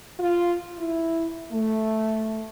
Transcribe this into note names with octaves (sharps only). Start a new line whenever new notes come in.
F4
E4
A3